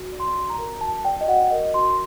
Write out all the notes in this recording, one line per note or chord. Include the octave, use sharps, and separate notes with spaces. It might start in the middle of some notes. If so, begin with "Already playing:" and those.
Already playing: F#4
D5
C6
F#4
A#5
A#4
F#4 A5
D5 G5
D#5
F#4 F#5
A#4 D#5
F#4 C6